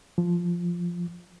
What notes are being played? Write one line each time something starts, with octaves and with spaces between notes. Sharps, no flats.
F3